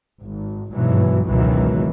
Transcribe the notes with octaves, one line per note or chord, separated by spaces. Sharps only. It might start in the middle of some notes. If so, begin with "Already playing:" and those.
G#1
G#1 G2 B2 E3 F#3
G#1 C#2 B2 D#3 E3 F#3